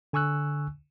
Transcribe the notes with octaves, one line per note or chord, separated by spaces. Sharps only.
D3 G#5 C#6 E6 F#6